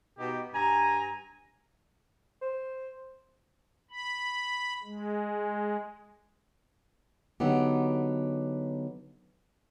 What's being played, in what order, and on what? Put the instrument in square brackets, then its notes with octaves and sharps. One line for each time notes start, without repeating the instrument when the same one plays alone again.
[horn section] B2 D#4 G4
G2 G#5 A#5
[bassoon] C5
[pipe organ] B5
G#3
[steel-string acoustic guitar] D3 F#3 B3 D#4 G4